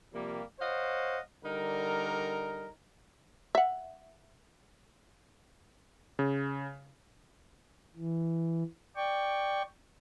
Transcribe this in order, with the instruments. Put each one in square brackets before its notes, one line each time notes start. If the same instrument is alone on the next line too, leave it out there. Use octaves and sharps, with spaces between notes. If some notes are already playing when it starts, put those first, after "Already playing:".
[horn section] C3 F3 G3 A#3
C5 C#5 D#5 F5 F#5
D3 G3 D#4 A#4
[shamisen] E5 F#5
[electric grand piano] C#3
[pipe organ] E3
D5 G5 C#6